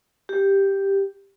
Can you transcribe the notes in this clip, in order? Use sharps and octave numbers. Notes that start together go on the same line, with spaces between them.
G4